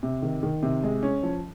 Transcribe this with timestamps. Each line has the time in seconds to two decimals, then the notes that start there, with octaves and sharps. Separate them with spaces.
0.03 C3
0.22 D#3
0.43 D#3
0.63 C3
0.83 G#3
1.03 C#4
1.23 F3